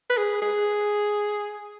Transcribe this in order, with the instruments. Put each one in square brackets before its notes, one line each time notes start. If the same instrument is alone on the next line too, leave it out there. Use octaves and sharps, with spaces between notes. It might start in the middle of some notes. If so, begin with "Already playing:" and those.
[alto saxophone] B4
G#4
G#4